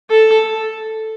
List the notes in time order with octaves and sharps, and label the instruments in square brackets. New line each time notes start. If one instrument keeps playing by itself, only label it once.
[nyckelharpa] A4